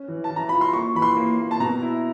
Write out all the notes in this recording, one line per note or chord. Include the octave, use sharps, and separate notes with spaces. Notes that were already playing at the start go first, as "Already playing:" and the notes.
Already playing: C#4
E3
A5
E3
A#5
F4 B5
C6
A#3 C#6
E3 B5
C6
A#3
A#3
A5
B2 A#5
E4